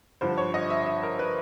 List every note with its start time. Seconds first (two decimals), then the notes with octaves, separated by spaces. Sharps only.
0.21 G2 D3 F3 C5
0.38 C#5
0.54 D#5
0.70 E5
0.86 E5
1.03 A#4
1.19 B4